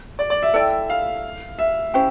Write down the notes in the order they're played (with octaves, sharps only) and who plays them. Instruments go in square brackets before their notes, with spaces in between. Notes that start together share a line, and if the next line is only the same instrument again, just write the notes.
[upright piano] D5
D5
E5
[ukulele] E4 A4 D5 G5
[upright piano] F5
E5
[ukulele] C#4 E4 G4 C5